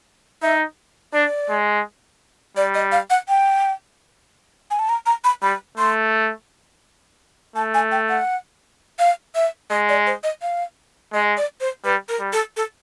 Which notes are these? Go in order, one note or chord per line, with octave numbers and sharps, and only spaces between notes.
D#4 E5
D4 D5
G#3
G3 D5
D#5
F5
F#5
G5
G#5
A5
A#5
A#5
B5
G3 B5
A3 C6
A3 A5
G#5
G5
F#5
F5
E5
G#3 D#5
D5
C5
D#5
F5
G#3 D#5
D5
C5
G3 B4
A#4
G3
A4
A4